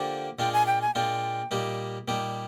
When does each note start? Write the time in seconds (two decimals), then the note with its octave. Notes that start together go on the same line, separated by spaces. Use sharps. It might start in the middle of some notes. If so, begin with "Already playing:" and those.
Already playing: D3 F3 A#3 D4 G4 G5
0.39 A#2 G#3 D4 F4 G5
0.53 G#5
0.67 G5
0.81 G#5
0.95 A#2 G#3 D4 F4 G5
1.51 A#2 G3 A#3 D#4 G4
2.08 A#2 G3 A#3 D#4 G4